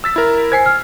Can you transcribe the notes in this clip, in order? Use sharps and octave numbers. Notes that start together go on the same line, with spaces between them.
E6 A6 B6
E4 A#4
C5 G#5 G#6 B6 C7
F6